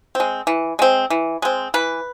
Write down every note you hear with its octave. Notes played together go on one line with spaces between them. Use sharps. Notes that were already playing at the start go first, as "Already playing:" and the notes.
G#3 C4
E3
G#3 C4
E3
G#3 C4
E3 B4